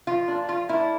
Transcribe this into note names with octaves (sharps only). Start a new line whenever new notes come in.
F3 F4
A#3 D4
F3 F4
A#3 D4 E4